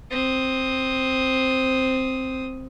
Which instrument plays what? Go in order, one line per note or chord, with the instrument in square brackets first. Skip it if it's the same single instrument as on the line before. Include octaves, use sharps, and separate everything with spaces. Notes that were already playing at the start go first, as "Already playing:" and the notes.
[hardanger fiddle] C4 D#6